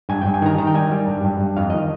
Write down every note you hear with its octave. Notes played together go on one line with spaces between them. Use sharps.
G2 G#5
G2 G5
G#5
D#3 A#5
D#3 A#5
G5
G3 G#5
G3
G2
G2
G2
F2 F5
D#3 D#5